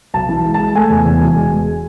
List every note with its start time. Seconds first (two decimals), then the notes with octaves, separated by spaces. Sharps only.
0.14 B1 A5
0.29 E3
0.45 G#3
0.54 A5
0.59 G#3
0.75 A3 G#5
0.90 E2
1.05 E2
1.21 E1
1.36 G#3
1.52 G#3